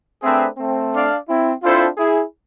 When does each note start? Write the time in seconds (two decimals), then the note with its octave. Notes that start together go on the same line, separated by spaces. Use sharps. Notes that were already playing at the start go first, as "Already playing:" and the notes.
0.23 A3 C4 D4 G#4 B4 E5
0.58 A3 C4
0.92 D4 A4 D5 F5
1.27 C4 E4
1.62 C4 D4 E4 F4 A4 C5 E5
1.97 E4 G#4